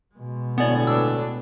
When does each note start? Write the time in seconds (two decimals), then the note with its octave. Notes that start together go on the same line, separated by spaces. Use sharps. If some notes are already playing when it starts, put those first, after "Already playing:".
0.15 B2 G#3
0.58 D2 A2 B3 D5 G#5
0.87 B3 D4 E6